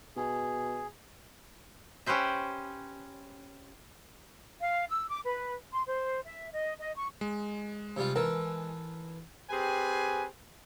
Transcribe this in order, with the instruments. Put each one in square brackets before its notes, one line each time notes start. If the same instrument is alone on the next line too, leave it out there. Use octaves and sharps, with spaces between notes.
[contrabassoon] B2 [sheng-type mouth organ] G#4
[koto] C#4 G4 B4 C5 E5
[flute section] F5
E6
D6
B4
C6
C5
E5
D#5
D#5
C#6
[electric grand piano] G#3
[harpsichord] C3 G3 F4
[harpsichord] E3 A4 [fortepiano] A#4
[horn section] C4 G4 G#4 B4 G#5